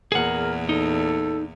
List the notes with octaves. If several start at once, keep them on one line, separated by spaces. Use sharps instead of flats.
E2 A#2 G#4 A#4 F#5
D#4 A4